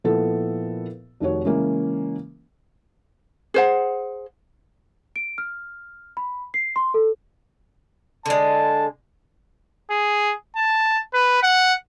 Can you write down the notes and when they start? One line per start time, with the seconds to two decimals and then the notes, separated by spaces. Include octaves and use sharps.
0.04 A#2 F3 B3 E4 A4
1.20 F1 D#3 F#4 C#5
1.44 C#3 E3 G#3 A#3 C#4
3.54 G#4 C5 F#5
5.16 D7
5.38 F6
6.17 B5
6.54 C7
6.76 C6
6.94 A4
8.26 D3 G#3 A5
9.91 G#4
10.56 A5
11.14 B4
11.43 F#5